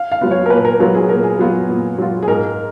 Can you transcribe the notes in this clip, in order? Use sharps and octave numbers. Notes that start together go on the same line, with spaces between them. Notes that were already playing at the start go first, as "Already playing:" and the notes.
Already playing: F5
F5
F#3 B3 F4
C#5
A#4
A#2 B4
A#4
F#3 B3 F4 A#4
G#4
A#2 A#4
G#4
F#3 B3 F4
A#2
F#3 B3 F4
G#4
G#2 A#4